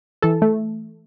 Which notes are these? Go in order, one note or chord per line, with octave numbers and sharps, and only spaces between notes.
E3 A4 A5
A3